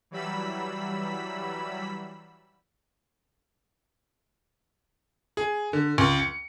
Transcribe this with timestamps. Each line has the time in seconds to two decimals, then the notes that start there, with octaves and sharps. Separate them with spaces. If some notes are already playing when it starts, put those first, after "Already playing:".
0.11 E3 F#3 G3 B5 E6 B6
5.37 G#4
5.73 D3
5.98 C#2
6.20 C#7